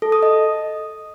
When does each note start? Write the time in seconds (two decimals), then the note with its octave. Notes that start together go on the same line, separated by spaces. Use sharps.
0.02 A4
0.12 D#6
0.23 D#5